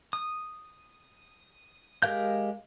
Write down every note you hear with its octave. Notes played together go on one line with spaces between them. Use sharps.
D#6
G#3 G4 A#4 F5 G6